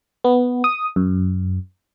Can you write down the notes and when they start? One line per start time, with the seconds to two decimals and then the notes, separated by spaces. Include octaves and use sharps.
0.24 B3
0.64 D#6
0.96 F#2